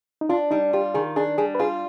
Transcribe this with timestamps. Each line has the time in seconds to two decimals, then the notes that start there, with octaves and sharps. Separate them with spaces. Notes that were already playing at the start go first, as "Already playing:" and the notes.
0.21 D#4
0.29 D4 F4
0.51 G3 D#4
0.73 F4 G4
0.94 D#3 G#4
1.16 D4 G#4
1.38 G3 G#4
1.55 B4
1.59 F4 G#4